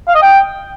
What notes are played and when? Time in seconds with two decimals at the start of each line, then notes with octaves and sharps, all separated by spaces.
0.08 F5
0.15 D#5
0.22 G5